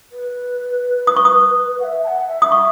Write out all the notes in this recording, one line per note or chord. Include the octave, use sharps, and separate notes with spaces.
B4
D#6
C#6
D#6
F#5
E5
A5
F#5
E5
D#6
C#6